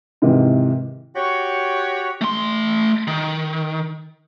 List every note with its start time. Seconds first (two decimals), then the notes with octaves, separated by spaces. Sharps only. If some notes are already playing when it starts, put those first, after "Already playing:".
0.22 G#2 C3 D#3 E3
1.15 F#4 G4 C#5
2.21 A3 C6
3.07 D#3